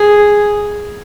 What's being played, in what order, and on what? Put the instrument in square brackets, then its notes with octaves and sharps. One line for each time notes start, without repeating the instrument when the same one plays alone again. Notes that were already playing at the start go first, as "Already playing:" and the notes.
Already playing: [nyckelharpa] G#4